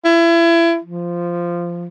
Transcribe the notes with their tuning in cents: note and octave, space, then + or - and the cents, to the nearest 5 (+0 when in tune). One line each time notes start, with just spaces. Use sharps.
E4 +30
F3 -10